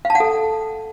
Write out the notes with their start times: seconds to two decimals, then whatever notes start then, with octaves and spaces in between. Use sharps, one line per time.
0.05 F5
0.10 A5
0.15 F#5
0.20 A4